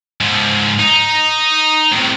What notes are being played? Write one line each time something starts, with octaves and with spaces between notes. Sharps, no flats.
G#2 F3
D#4
A2 C3